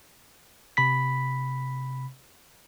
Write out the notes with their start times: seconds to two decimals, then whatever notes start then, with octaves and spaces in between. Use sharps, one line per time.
0.77 C3 B5 B6